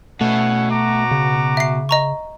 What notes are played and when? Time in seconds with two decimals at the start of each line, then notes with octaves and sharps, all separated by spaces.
0.21 B2 A3 C#4 E4 F#5
0.71 F#4 A#5 D6
1.11 C#3
1.57 E5 C7
1.89 D#5 A#5 C#6